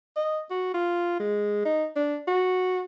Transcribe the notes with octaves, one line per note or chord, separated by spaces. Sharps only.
D#5
F#4
F4
G#3
D#4
D4
F#4